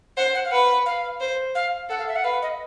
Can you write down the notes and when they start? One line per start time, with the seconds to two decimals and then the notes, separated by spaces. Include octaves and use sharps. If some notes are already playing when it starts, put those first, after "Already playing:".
0.17 C5 F#5
0.34 F#5
0.45 F5
0.51 B4 F#5
0.86 F5
1.20 C5
1.55 F5
1.89 A4 F#5
1.99 F5
2.08 E5
2.16 F#5
2.24 B4 F5
2.42 D#5